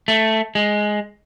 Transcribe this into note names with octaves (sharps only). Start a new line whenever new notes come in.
A3
G#3